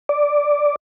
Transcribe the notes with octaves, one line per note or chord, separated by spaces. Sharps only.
D5